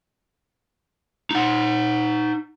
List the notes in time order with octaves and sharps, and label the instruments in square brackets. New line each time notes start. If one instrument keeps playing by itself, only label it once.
[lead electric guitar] D#4 F#5